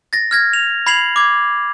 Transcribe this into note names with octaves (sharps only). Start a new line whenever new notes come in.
A6 A#6
F6 G#6 A#6
F7
B5 G#6 C7 F7 F#7
D6 G#6